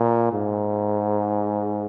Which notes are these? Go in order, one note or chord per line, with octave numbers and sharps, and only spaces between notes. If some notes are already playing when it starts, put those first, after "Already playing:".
Already playing: A#2
G#2